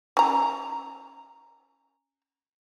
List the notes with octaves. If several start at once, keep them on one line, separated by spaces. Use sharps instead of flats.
C#4 A#5